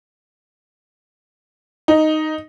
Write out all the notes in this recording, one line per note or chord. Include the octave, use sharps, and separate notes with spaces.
D#4